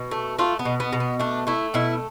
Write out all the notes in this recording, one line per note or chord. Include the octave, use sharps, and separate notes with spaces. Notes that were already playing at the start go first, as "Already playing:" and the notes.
Already playing: B2
A3
A3 F4
B3
B2
B3
B2
B3
A3 D4
A3 E4
B2 E4